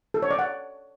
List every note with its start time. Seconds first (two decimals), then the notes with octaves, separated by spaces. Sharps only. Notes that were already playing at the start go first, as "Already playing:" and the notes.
0.14 A4
0.22 C#5
0.31 D5
0.39 F#5